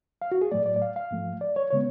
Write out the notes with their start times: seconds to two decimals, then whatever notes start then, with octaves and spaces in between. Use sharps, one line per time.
0.22 F5
0.32 F#4
0.42 G#4
0.51 A2 F#3 A3 D5
0.66 D5
0.76 D5
0.82 F5
0.96 F5
1.11 G#2 F3 A3
1.41 D5
1.56 C#5
1.70 C#3 G#3 B3 C#5